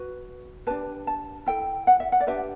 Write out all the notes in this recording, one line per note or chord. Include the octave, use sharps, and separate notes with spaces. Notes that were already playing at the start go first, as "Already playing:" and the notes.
Already playing: F#4 B4
D4 G4 B4 A5
A5
E4 A4 G5
F#5
E5
F#5
D5
D4 G4 B4 E5